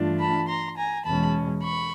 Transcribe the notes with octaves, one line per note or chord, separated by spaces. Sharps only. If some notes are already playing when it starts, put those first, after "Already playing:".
Already playing: G2 E3 A3 D4 F4
A5 B5
A#5 C6
G#5 A#5
E2 B2 G#3 C#4 A5 B5
B5 C#6